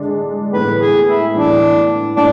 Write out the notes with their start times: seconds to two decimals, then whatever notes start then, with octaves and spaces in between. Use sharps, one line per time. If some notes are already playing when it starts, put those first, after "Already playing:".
Already playing: D3 G#3 D4
0.53 A2 E3 B3 B4
0.81 G#4
1.07 E4
1.34 A2 E3 B3 D4
2.17 A2 D4